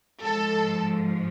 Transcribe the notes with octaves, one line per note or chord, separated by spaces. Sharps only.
G#2 F3 A4